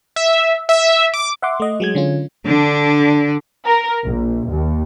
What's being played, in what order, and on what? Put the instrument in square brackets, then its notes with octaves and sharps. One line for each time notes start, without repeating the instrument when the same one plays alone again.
[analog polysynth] E5
E5
D6
[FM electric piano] E5 F#5 C6 D6
A3 D#5
F#3 G#3 G#6
D3 C#4 F4
[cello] D3 D4
[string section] A#4
A#1
D#2